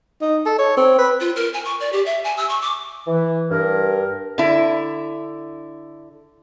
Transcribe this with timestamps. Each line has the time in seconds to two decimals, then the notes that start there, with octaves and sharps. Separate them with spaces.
0.21 D#4
0.46 A4
0.59 C#5
0.77 C4
0.98 B4
1.20 F4
1.36 A#4
1.54 G#5
1.65 C#6
1.80 D5
1.92 G4
2.06 E5
2.24 G#5
2.37 E6
2.49 C#6
2.61 D6
3.07 E3
3.51 G2 A#4
4.38 D3 E4